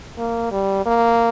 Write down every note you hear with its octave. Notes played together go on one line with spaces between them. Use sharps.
A#3
G3
A#3